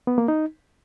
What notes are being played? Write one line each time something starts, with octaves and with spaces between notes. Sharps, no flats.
B3
A#3
D#4